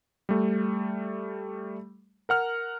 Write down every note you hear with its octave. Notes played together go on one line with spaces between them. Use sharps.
G3 A3
A#4 F#5 F6